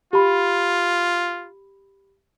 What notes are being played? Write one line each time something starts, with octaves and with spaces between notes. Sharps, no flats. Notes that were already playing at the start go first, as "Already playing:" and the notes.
F4 G4 B5